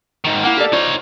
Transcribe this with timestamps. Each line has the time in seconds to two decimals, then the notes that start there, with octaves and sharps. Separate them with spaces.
0.25 G#2 D#3
0.43 A#3 E4 F#5 G#5
0.57 G4 A4 D5
0.73 D#4 F4 C5 C#5